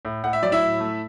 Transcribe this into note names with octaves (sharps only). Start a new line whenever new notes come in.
A2
A2 F#5
E5
F#3 D5
E4 E5
A2
A3